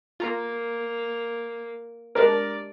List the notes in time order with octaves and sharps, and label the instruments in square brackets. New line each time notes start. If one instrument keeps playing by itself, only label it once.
[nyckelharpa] A#3 [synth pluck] F4 A#5
[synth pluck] G#3 D4 G4 [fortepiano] A#4 [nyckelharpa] D5